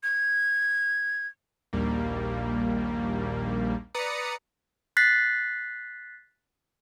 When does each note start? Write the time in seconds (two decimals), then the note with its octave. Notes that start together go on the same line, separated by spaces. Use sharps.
0.03 G#6
1.73 A#1 D#2 G3 A#3
3.94 B4 D5 A#5 D#6 C#7
4.97 F#6 A6 B6 C7